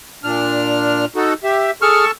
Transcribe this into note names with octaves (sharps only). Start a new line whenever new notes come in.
A#2 D4 F6
D#4 F#4 A4
G4 E5
G#4 A4 A5 C#6 F6